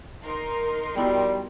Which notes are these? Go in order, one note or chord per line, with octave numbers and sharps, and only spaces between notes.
D#4 A#4 C6
G3 B3 E4 F#4 G5